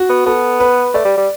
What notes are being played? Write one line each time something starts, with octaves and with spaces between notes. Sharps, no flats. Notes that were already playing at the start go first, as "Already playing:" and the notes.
Already playing: F#4
B3
B3 A4
B4
A3 D5
G3
G3